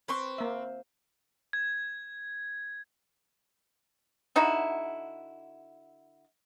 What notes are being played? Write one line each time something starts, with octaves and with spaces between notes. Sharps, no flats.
C4 B4 C6 C#6
A#3 E5
G#6
D3 D#4 E4 F#4